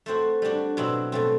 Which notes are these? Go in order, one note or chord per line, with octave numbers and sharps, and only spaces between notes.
A3 C4 F#4 C5
G3 D4 F#4
B2 F#3 C4 E4
B2 A3 C4